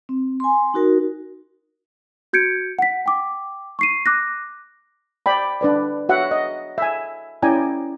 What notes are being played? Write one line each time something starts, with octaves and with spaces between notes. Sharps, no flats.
C4
G#5 C6
D#4 F#4 A#4
F#4 G6 G#6 C#7 D7
F#5 B6
G5 D6
C#6 C7 D#7
D6 F#6 A#6
D5 G5 B5
D4 B4 D5
F#4 C#5 E5 F#5
D#5
E5 G#5
C#4 E4 D5 G5 G#5 A#5